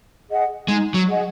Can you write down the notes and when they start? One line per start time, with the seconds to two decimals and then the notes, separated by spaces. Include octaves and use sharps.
0.30 G#4 D#5 F#5
0.68 G#3 D#4
0.94 F#3
1.07 G#4 D#5 F#5